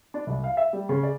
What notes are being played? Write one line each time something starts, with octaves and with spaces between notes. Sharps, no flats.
D4
C2
F5
E5
G3
C#3
D5